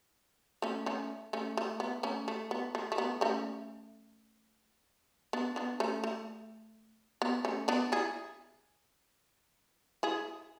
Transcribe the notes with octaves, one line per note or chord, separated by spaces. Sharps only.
A3 C#4
A3 C#4
A3 C#4
A3
B3
A3 C#4
A3
B3
A3
A3
B3
A3 C#4
B3 D4
B3 D4
A3 C#4
A3
B3
A3 C#4
B3 D4
E4 G#4
E4 G#4